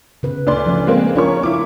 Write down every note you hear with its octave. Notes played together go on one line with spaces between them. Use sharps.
C#3 B4
D2 D5 C6
F3 C#4
G#3 A#3 C4
C#4 D4 F4 A#4 C#5 C#6
E4 F4 D6